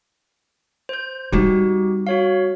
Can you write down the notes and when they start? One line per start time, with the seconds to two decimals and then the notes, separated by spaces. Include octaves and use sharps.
0.89 C5 G6
1.32 G3 C4 D#4 F#4 G4
2.07 F#4 C#5 F5